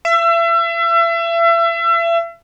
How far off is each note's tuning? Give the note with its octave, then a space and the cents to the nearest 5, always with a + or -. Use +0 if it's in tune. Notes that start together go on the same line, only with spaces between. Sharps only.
E5 +35